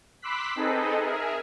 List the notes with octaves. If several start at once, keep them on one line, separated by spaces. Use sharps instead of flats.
B5 C6 D6 E6 F#6 B6
C4 D#4 G#4 A4 B4 D#5
G#4 A#4 E5